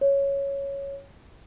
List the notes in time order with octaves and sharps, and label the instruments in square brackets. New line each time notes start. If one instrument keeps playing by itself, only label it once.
[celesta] C#5